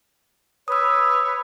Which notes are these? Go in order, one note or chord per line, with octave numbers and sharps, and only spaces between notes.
B4 C#5 D#6 E6